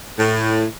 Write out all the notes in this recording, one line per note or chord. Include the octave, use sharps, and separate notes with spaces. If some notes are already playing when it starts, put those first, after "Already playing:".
A2